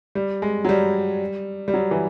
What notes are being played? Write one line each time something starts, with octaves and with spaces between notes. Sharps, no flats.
G3
G#3
F#3
G3
G3
F#3
E3